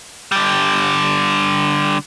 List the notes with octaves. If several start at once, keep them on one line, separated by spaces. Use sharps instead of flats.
D3 G3